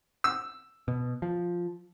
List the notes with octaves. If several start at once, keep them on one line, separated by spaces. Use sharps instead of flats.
E6
B2
F3